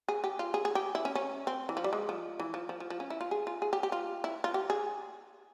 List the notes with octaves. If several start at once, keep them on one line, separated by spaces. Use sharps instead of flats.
G#4
G4
F4
G#4
G#4
G4
E4
C#4
C#4
C4
E3
F3
G3
G#3
F3
E3
F3
F3
F3
F3
C#4
E4
F4
G#4
F4
G#4
G4
G4
F4
E4
F4
G4
G#4